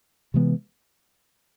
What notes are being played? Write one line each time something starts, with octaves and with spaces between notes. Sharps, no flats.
C3 E3 G#3 B3